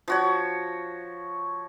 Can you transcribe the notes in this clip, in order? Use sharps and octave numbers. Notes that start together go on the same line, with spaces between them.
F3 F#4 C#5